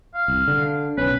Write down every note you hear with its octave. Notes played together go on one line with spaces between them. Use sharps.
F5
C2
D3
B1 C#4 B4